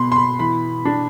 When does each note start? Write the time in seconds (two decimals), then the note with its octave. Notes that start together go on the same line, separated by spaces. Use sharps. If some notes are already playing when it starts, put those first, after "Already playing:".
Already playing: B2 B5 C6
0.12 C6
0.16 B5
0.39 E3 B5
0.85 D4